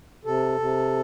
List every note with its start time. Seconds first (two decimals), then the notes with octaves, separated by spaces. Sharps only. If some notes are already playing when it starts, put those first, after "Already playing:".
0.25 C3 A4
0.60 C3